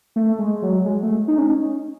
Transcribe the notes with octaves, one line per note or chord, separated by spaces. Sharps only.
A3
G#3
F#3
G#3
A3
D#4
C#4